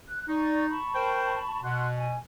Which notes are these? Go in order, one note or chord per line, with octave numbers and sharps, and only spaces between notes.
F#6
D#4 D5 C#6
A5 B5 C#6
A#4 C5 G5
B2 F#5 C6 F#6
G#5